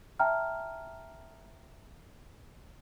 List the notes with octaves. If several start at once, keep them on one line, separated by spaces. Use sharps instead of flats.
E5 G5 A5 A#5 F6